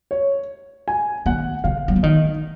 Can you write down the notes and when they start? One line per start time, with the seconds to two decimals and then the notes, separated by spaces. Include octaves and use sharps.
0.11 C#5
0.88 G#5
1.26 D#3 F#5
1.64 C#3 F5
1.88 F#3
1.96 F3
2.03 D#3 D#5